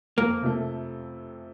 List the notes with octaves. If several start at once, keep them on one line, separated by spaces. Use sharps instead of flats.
F2 A#3
C3 F3 A3